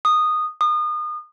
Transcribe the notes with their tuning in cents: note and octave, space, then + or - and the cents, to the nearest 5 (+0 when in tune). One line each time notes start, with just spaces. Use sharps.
D#6 -15
D#6 -35